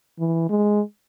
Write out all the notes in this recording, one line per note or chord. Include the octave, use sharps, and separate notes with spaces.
E3
G#3